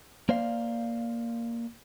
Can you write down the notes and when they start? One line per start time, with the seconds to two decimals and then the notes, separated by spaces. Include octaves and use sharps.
0.29 A#3 C5 D5 F5